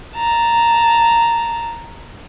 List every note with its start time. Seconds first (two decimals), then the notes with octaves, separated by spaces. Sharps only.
0.17 A5 A#5